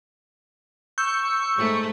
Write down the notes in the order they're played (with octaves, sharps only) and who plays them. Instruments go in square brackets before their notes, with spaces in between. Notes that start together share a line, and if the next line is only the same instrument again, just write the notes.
[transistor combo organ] C#6 [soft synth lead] E6 [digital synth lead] G6
[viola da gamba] G#2 A3